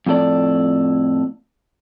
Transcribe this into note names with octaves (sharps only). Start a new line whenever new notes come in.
F2 A2 A4 D5